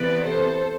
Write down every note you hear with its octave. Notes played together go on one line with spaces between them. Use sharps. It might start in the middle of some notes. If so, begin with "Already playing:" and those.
Already playing: C3 E3 B3 B4 D5
A4 C5